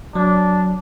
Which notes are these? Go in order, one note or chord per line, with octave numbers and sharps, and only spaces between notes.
F#3 D4